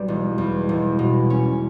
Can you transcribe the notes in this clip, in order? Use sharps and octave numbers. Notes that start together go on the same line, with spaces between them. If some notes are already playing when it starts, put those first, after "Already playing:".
Already playing: B1 G3 D4
E1
E2
E1
B2
C#4